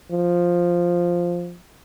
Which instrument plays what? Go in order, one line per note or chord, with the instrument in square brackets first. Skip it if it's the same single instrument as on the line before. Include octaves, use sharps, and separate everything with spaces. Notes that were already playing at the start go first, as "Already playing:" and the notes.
[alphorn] F3